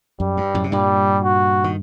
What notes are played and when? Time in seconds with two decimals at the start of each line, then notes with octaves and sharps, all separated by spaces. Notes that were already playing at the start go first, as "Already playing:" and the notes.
0.20 F#2 G3
0.37 G2
0.54 F#2 A2
0.64 C3
0.72 G2 A#2 G3
1.24 F#4
1.64 D#3